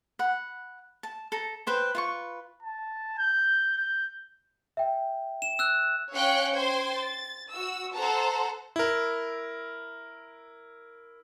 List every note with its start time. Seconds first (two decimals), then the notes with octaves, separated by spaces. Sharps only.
0.19 F#5 B5
1.03 A5
1.32 A4 A#5
1.67 B4 C5 G5
1.95 F4 B4 C#6
2.63 A5
3.18 G6
3.78 G6
4.77 E5 G5
5.42 E7
5.59 E6 F#6
6.13 C#4 C#5 F5 G5 F#6 C#7
6.56 C5 G5 C6 G#6
6.94 A6
7.50 F#4 E6
7.95 A4 C5 F#5 A5 A#5
8.76 E4 A#4